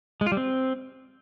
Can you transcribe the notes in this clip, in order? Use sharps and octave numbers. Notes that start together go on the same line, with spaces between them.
G#3
F4
G3
C4